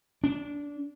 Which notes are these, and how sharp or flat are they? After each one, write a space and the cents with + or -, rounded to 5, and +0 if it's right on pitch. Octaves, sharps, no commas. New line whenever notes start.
D4 -20